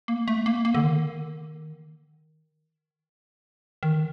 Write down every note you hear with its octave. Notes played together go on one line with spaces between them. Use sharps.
A#3
A3
A#3
A#3
D3
D#3
D#3